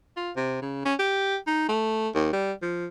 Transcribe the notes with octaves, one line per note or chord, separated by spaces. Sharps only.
F4
C3
C#3
C#4
G4
D#4
A3
D#2
G3
F3